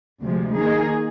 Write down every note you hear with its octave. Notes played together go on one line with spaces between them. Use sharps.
D2 C3 F3 G#3
D#3 A#3 D#4 G#4